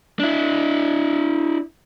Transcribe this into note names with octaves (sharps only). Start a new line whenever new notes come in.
D4 E4